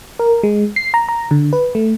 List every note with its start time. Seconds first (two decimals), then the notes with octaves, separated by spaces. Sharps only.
0.19 A#4
0.43 G#3
0.76 C7
0.94 A#5
1.09 A#5
1.31 D3
1.53 B4
1.75 A3